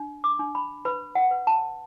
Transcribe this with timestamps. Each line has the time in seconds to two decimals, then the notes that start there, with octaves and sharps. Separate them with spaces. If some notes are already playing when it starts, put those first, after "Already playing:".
Already playing: D4
0.24 D6
0.39 D4
0.55 B5
0.85 B4 B5
1.15 F#5
1.31 B4
1.47 A5